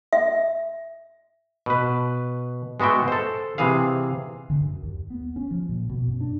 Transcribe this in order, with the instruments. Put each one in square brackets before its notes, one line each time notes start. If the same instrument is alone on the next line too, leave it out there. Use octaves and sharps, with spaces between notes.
[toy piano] E5
[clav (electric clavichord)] B2 B4
G#3 B3 F#4 E5 G5
A4 C5
C3 E3 G#4 F5
[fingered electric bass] D3
F#2
D#2
B3
C#4
F3
A#2
B2
F#2
D4